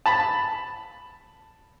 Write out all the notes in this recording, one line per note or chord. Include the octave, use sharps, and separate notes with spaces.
A5 B5